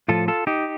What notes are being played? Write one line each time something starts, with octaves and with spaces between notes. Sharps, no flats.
A2 F3 F4 A4
F4 A4
D#4 G4